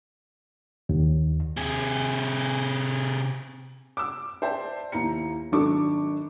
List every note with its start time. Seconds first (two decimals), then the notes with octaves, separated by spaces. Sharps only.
0.89 D#2
1.57 C3 G#4
3.97 D6 E6
4.42 C5 D5 E5 G5 A5
4.92 D#2 E4 A#5 C#7
5.52 G#1 F#3 D4 A4 C#6 D6